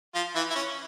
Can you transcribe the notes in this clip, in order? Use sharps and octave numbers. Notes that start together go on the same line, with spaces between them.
F3 F4
E3 E4
E4
C#4